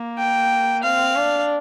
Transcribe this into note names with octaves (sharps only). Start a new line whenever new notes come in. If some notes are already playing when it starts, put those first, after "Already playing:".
Already playing: A#3
G5
C4 F5
D4